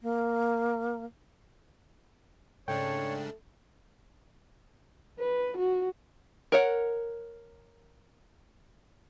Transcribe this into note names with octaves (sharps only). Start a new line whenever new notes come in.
A#3
G#2 C#3 A3 D4 C#5 G5
B4
F#4
A#4 C#5 F#5